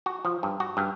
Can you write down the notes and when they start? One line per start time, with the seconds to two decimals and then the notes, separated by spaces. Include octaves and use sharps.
0.06 F#4
0.25 F3
0.43 G2
0.60 F#4
0.77 G2